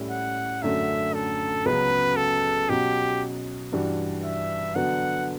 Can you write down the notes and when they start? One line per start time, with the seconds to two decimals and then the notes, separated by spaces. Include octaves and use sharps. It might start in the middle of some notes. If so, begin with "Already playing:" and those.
Already playing: A2 G3 C#4 E4
0.10 F#5
0.62 F#2 D3 A3 C#4 F#4 E5
1.14 A4
1.66 C#2 C#3 F#3 B3 B4
2.17 A4
2.69 B2 F#3 C#4 F#4 G4
3.73 G2 E3 G3 D4 F#4
4.23 E5
4.75 D3 F#3 B3 F#4 F#5